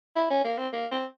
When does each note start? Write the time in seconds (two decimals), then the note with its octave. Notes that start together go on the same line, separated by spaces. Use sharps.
0.16 E4
0.30 C#4
0.45 A#3
0.58 C4
0.73 A#3
0.91 C4